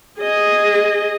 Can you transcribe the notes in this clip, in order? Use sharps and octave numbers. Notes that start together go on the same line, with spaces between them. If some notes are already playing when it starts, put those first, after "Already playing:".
G#4 D#5